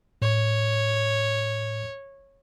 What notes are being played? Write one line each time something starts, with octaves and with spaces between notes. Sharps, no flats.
A2 C#5